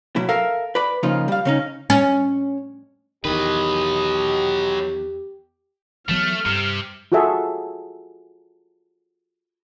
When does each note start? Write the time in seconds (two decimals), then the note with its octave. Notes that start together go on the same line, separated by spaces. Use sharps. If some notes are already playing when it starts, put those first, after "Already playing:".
0.16 B2 F#3 E4
0.29 A4 A#4 E5 F5
0.75 B4 D5 B5
1.03 C#3 F3 A#3 D#4 F4
1.28 G3 F5
1.45 C#3 C#4 D#4
1.90 C#4
3.25 E2 D#3 F#3 G4 B4 D#5
6.09 E3 F#3 A3 B3 F6
6.46 G2 C3
7.12 F4 F#4 G#4 A4 E5